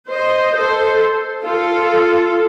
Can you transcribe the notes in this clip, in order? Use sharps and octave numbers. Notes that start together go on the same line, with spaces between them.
C5 D#5
A4 C5
F4 A4